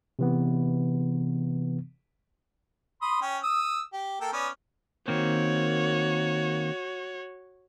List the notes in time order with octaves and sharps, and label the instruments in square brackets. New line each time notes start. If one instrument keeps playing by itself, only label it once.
[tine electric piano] C3 E3 B3
[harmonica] B5 C6 D#6
C#4 G5
D#6 E6
G4
A#3 A4 G5
B3 C#4 D5
[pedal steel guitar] D#3 A#3 C4 [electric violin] F#4 C#5